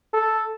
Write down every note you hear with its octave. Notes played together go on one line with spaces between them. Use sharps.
A4